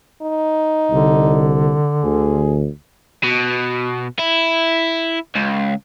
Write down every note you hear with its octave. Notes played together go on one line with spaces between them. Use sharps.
D#4
C2 D3
D2 G#4
B2
E4
C#2